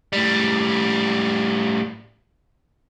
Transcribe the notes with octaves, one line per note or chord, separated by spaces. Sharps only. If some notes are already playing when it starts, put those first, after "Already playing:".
A2 G3